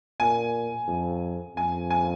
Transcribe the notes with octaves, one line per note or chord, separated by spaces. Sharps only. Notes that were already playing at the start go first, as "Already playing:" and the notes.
A#2 G#5
F2
F2 G#5
G#5